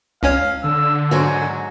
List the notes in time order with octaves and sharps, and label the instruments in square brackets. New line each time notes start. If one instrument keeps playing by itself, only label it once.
[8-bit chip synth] C#2 C#4 C#5 [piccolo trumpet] F5
[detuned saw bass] D3 [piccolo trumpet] E6
[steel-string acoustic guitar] G#2 F#3 F#4 [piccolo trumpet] G#5